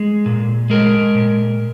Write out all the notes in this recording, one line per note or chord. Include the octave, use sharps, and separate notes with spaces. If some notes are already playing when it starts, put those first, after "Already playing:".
Already playing: G#3
A#2
G#3 A#4
A#2